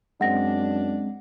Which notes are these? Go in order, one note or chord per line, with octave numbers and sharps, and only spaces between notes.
F#2 G#3 C4 D4 F#5 A#6